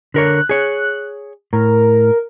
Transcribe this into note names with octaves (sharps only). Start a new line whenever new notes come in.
D3 A#4 C#5 F#6
G#4 C#5
A2 A#4